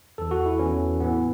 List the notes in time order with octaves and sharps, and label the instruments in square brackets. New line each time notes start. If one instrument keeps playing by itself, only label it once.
[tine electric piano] E2 E3 A4
F#4
E4
E2 E3 C#4
A2 E3 B3